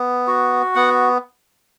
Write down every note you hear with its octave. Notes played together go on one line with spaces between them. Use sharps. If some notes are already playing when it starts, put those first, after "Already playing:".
Already playing: B3
F#4
B3 F#5